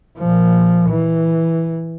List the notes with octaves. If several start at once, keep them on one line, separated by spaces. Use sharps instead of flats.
A#2 F3
E3